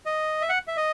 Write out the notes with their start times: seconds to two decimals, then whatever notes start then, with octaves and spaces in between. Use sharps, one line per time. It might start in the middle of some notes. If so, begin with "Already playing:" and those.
0.06 D#5
0.41 E5
0.49 F#5
0.68 E5
0.77 D#5